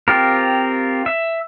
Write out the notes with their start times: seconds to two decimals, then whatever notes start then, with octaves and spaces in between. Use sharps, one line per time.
0.08 C4 F4 G4 A#4
1.06 E5